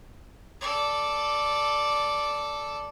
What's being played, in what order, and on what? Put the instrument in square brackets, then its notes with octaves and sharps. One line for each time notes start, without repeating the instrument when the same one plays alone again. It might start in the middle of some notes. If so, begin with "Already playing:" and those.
[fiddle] A4 D5